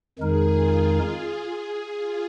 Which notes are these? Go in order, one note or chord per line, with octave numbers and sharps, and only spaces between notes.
F2 D#3 G#3 D#4 G#4 A#4
F4
G#4
F4